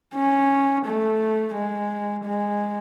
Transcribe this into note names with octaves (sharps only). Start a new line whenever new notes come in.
C#4
A3
G#3
G#3